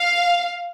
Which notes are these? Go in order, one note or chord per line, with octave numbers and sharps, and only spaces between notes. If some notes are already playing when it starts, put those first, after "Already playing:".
Already playing: F5